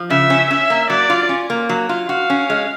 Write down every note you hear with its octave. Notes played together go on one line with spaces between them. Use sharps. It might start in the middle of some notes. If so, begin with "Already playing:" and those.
Already playing: F3
C#3 E5
C#4
C#4 E5
A#3
F#3 D5
F4
C#4
A#3
F#3
F4
F#4 F5
C#4
G#3